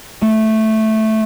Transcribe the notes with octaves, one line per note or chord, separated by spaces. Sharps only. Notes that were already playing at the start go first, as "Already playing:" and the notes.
A3